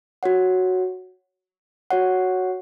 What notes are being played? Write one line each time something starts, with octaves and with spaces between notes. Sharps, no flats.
F#4 C#5 F#5
F#4 C#5 F#5